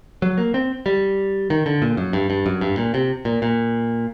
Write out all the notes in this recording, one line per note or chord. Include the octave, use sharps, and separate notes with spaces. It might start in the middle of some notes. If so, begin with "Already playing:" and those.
F#3
A#3
C4
G3
D#3
D3
A#2
F#2
G2
G2
F#2
G2
A#2
C3
A#2
A#2